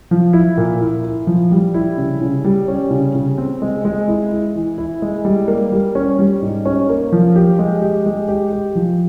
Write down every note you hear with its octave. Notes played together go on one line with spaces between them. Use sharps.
F3
E4
A#2
E4
E4
F3
G3
E4
C#3
C#3
G3
C#4
C#3
C#3
C4
G#3
G#3
E4
E4
E3
E4
G#3
G3
A#3
G3
C#4
G3
G#2
C#4
A#3
F3
G4
G#3
G4
G#3
G4
G4
F3